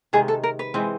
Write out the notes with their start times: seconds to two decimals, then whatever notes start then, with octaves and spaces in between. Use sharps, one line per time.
0.13 C3 D#3 G#3 G#4
0.28 A4
0.43 A#4
0.59 B4
0.74 E3 G#3 C4